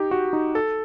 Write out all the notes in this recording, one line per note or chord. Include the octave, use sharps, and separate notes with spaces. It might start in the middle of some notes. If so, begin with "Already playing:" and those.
Already playing: D#4 G4
F#4
D#4
A4